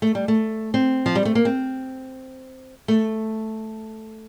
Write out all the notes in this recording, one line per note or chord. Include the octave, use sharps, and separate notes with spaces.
A3
G3
A3
C4
F3
G3
A3
A#3
C4
A3